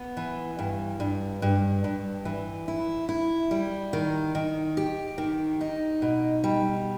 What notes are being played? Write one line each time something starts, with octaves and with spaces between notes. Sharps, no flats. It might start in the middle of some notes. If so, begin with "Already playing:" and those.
Already playing: B3
E3
G2
G2
G2
G2
E3
E4
E4
G3
D#3
D#3
G4
D#3
D#4
B2
G3